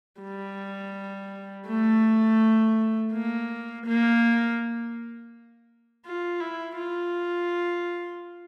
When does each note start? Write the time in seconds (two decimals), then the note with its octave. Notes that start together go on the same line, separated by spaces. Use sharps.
0.21 G3
1.67 A3
3.13 A#3
3.86 A#3
6.05 F4
6.41 E4
6.78 F4